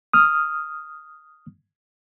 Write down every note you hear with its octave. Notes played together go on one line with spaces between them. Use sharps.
D#6 F6